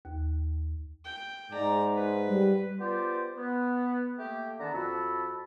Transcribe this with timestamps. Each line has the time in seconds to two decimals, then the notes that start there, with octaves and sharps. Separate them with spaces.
0.05 D#2
1.04 G5
1.51 G#2 D5 A#5
1.94 B4
2.28 G3
2.79 B3 F4 G4 C5 D5
3.37 B3
4.18 A3 A#3 G4
4.59 D3 D#3 B3 A5 A#5
4.73 F2 F#4 A5 B5 E6